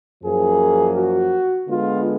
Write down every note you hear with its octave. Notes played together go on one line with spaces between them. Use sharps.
F#2 F3 A#3 G#4
F#4
D3 G#3 B3 F4